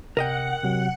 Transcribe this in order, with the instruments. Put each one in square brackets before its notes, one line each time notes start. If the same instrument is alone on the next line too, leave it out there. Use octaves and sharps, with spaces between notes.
[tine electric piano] C3 [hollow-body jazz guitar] A#4 D#5 G5 [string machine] F#5
[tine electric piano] C3 F#3